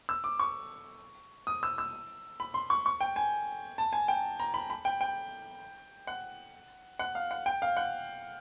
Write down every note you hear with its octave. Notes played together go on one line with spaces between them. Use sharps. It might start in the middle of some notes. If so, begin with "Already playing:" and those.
E6
D6
C#6
D#6
E6
E6
B5
C6
C#6
C#6
G5
G#5
A5
G#5
G5
A#5
B5
B5
G5
G5
F#5
F#5
F5
F#5
G5
F5
F#5